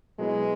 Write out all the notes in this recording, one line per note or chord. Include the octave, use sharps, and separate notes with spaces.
B2 F#3 G#3 B3 E4